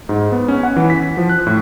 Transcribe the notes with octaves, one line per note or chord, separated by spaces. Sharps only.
G#2
B3
C#4
F#5
E3
B6
F3
F#6
A2